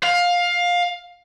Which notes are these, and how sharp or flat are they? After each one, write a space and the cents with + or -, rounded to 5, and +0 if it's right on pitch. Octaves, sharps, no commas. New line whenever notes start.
F5 +15